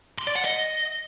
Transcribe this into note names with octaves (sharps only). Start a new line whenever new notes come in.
C6
D5
F#5
D#5